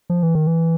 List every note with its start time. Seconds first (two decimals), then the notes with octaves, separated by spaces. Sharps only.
0.10 F3
0.23 E3
0.35 D#3
0.47 E3